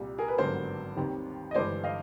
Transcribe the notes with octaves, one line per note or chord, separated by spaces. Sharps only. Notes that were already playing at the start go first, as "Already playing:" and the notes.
Already playing: C2 A#2 G3
G#4 A#4
B4
G#1 G2 D3 F#3 B3 A#4 C5
D#2 D#3 G3 C4
D#5
G1 G2 E3 G#3 C5 D5
D#5 F5